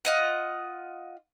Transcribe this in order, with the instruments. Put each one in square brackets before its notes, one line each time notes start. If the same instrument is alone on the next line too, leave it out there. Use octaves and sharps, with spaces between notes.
[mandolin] F4 D#5 F#5